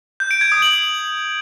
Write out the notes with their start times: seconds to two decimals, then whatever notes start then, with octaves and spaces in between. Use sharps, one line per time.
0.20 G6
0.31 D7
0.41 G#6
0.52 D#6
0.62 F#7